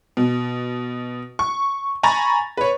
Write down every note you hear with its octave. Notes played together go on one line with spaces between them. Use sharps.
B2
C#6
G#5 A#5 B5 C#6 A6 F7
B4 C#5